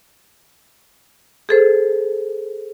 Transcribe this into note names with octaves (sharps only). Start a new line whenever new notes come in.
G#4 A4 C5